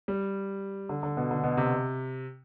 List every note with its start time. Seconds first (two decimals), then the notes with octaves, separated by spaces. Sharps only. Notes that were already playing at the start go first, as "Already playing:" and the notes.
0.08 G3
0.89 D3
1.03 D3
1.17 B2
1.31 D3
1.44 B2
1.57 C3